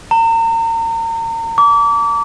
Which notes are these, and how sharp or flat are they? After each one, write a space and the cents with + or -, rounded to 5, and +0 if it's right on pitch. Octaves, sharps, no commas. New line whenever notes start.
A#5 -35
D6 -30